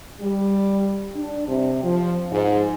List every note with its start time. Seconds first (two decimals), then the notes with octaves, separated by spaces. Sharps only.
0.21 G3
1.15 D4
1.48 C3
1.83 F3
2.31 G#2